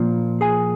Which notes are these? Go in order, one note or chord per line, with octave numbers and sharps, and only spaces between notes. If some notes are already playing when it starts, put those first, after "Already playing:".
Already playing: A#2 F3 A#3
G#4 G#5